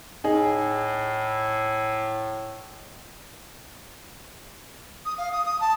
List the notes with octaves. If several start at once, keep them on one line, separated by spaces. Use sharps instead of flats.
A2 D#4 G#4
D#6
F5
D#6
D#6
A5